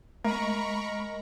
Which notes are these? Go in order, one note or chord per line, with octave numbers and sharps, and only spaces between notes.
G#3 A3 A#4 D#5 A#5 B5 C#6